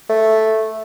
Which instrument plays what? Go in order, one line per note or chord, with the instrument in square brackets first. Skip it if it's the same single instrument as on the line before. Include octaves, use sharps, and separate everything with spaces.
[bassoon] A3